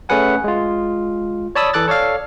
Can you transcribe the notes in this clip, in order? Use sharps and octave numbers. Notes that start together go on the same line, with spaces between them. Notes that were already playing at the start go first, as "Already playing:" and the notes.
A3 C#4 G#4 B4 F#5 G#5
G#3 F4
C#5 D5 A5 B5 D#6 E6
E3 A4 D6 F#6 A6
A4 C#5 D5 F5